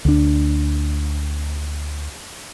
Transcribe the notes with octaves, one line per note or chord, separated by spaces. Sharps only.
D2 D4